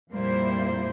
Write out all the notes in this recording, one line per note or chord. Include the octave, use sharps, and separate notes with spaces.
F2 A#2 G3 A#3 E4 C5